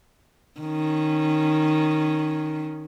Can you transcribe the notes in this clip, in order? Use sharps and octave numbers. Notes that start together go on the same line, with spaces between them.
D#3 C#4